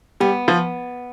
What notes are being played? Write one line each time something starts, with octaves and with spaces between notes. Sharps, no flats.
G3 B3
F3